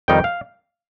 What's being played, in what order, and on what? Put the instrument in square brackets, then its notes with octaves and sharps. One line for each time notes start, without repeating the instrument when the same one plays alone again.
[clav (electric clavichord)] F2 D#3 G3 D#4 G5
F5